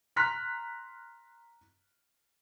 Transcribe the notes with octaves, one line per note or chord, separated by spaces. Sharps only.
A#5 C6 F6 F#6 B6